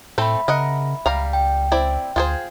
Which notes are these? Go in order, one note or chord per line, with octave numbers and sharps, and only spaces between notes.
A2 A3 C4 A4 E5 B5
C#3 A#4 D#5 F#5
C#2 G3 F5 A#5
G5
C4 E4 D5
D2 F4 G#4 C5